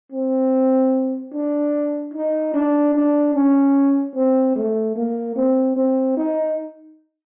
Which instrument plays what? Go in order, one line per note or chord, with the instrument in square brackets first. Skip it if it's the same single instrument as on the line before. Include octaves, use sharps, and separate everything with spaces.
[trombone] C4
D4
D#4
D4
D4
C#4
C4
A3
A#3
C4
C4
D#4